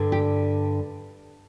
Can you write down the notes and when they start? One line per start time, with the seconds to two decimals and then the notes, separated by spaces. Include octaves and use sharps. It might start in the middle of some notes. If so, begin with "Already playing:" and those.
Already playing: G2 D3
0.12 G4